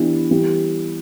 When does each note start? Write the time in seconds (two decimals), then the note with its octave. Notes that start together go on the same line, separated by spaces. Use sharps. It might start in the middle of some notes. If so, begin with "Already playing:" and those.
Already playing: E3 B3 D4 G4
0.31 E3 G3 B3 G4